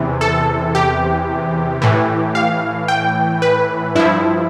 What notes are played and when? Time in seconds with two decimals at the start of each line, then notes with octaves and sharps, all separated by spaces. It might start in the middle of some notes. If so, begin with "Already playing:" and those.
Already playing: E2 C3 E3
0.21 A4
0.75 G4
1.82 A2 E3
2.35 F5
2.88 G5
3.42 B4
3.95 G2 F3 E4